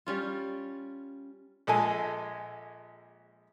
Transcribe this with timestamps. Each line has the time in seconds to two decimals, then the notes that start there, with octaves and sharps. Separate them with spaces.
0.07 G3 C#4 F4
1.67 A#1 G#3 A4 G#5